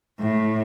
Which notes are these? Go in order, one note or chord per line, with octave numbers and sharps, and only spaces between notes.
A2